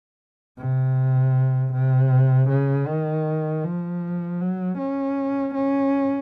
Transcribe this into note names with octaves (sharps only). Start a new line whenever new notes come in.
C3
C3
C#3
D#3
F3
F#3
C#4
C#4